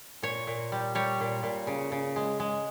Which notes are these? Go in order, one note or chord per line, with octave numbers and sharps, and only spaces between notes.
A#2 C#5
A#2
G3
G3 C#5
A#2
A#2
C#3
C#3
G#3
G#3